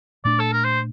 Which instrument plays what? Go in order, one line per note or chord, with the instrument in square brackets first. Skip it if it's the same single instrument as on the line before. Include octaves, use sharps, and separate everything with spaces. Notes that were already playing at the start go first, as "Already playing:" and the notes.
[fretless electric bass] A#2 A3 D4 [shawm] D5
[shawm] A4
A#4
C5